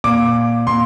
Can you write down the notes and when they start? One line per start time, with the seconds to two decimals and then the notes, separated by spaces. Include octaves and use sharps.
0.04 A#2 D6
0.67 A#2 C6